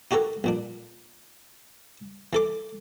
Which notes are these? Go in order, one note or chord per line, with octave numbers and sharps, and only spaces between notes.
D#4 F#4 G4 A4 A#4
A#1 A#2 D4
E3 A4 D6